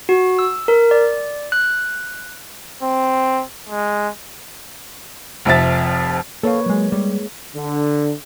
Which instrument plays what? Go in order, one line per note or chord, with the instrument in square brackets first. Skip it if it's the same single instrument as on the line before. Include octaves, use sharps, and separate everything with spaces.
[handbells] F#4
E6
A#4
D5
F#6
[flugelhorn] C4
G#3
[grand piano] F1 F2 E5 A6
[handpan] A#3 B4 C#5 [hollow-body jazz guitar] A4 F5
[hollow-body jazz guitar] F#3 G#3
[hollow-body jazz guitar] G3 [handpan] G#3
[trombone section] D3